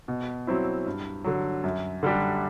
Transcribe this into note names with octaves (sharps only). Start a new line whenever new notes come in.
B2
F#3 C4 E4
G2
D3 F#3
F#2
D3 G3 D4 G4